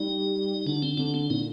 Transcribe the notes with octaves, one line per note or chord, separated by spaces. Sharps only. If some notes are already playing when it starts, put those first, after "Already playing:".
Already playing: G3 D#4
D3 D4
C4
D3 D4
C4
A#2 D#4